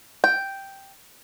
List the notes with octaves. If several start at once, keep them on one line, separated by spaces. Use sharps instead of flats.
G5